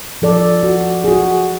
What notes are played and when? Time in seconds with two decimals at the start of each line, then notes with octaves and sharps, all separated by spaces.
0.22 F3 A4 D5
0.63 F#4
1.04 F#4 G#4